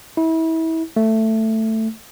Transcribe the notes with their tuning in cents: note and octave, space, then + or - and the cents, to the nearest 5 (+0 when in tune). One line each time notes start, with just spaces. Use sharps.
E4 -30
A3 +10